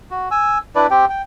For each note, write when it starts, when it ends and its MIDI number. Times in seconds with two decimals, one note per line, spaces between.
0.11 0.29 66
0.31 0.58 80
0.31 0.58 88
0.76 0.87 62
0.76 0.87 64
0.76 0.87 71
0.76 0.87 74
0.91 1.05 60
0.91 1.05 67
0.91 1.05 79
1.10 1.22 79